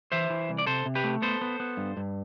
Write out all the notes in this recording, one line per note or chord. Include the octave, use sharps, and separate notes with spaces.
E3 C5 E5
E3
C2
D5
C3 A4 C5
C3
G4 B4
A3
B3 A4 C5
B3
B3
G2
G2